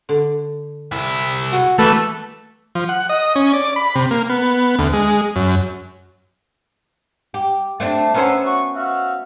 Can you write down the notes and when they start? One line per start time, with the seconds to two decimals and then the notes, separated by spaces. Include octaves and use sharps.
0.09 D3
0.92 C2 E4
1.53 F#4 G#4 F#5
1.79 E3 A3 B4
2.75 F3
2.89 F#5
3.09 D#5
3.35 C#4
3.53 D5
3.76 B5
3.95 C3
4.11 A#3
4.30 B3
4.79 D2
4.93 G#3
5.36 F#2
7.34 G4
7.80 A3 C4 D4
8.14 B3 C#4 A#4 C5 E5 F#5
8.43 F#4 C#6
8.74 F#4 E5 F5